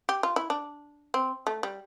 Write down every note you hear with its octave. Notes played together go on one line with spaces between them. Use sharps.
G4
F4
E4
D4
C4
A3
G3